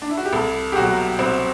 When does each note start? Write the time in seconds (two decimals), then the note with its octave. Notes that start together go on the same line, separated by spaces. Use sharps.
0.02 D4
0.10 E4
0.17 F#4
0.26 G4
0.33 C2 A4
0.72 G4
0.76 B2 F#3 F#4
1.19 C2 C4